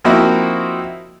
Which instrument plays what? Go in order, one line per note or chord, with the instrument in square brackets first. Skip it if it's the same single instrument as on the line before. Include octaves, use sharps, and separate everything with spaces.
[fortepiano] F3 A#3 C4 D#4 E4 F#4